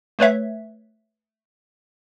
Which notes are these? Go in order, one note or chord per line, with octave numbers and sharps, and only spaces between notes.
A3 B4 C#5 E5